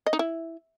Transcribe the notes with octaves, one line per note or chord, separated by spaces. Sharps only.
D#5
D#4
E4